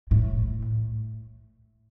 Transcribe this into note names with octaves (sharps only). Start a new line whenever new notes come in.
A2